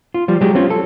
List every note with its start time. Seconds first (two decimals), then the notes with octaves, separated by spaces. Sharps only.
0.14 F4
0.28 F3 G3
0.41 F#3 G#3 G4
0.55 C4 C#4 F4
0.70 A4